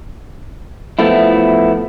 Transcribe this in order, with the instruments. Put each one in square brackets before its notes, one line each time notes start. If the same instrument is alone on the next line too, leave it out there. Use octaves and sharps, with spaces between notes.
[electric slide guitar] F3 A3 B3 E4